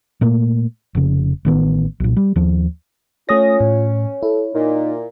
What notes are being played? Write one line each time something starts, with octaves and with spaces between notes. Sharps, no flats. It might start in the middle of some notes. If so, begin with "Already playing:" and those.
A#2 A3 A#3
F1 C#3
A1 D#3 B3
B1 A#2
G3
D#2 F3
A3 C#4 F4 C#5 D#6 A#6
A2
E4 A4
A#2 D#4